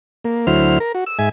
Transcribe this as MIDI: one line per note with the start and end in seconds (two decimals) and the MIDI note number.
0.25 0.46 58
0.47 0.79 38
0.47 0.79 54
0.47 0.79 64
0.47 0.79 72
0.47 0.79 89
0.80 0.92 70
0.95 1.04 66
1.06 1.18 88
1.19 1.29 44
1.19 1.29 76
1.19 1.29 80